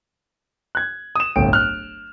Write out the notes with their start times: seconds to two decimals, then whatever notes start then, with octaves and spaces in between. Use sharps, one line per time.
0.75 F#6 G#6
1.16 D#6 E7
1.36 D1 G1 G5 D7
1.53 F6 F#6